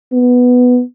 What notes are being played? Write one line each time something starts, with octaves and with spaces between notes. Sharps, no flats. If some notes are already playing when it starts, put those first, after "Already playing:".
B3